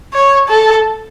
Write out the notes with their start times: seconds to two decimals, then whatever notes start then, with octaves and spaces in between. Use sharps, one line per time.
0.13 C#5
0.48 A4